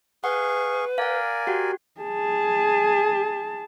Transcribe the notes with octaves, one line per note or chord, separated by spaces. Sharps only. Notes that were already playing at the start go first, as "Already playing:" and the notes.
G#4 B4 F5 F#5 C#6
A#4 D5 F5 F#5 G#5
F#4 G4 F#5
G#4 A5